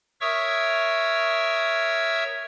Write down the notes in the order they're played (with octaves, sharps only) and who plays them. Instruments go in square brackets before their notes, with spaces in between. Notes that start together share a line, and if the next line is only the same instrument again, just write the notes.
[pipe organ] A#4 C#5 E5 C#6 D#6 E6